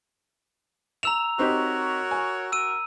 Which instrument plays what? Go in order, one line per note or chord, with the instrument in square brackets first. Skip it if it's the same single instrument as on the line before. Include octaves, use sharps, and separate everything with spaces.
[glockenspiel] A#5 E6 F7 [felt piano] E7
[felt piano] C4 D#4 G4 [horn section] F#4 A#4 C#5
[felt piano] G#5
[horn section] F#4 A#4 [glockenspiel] E6 D#7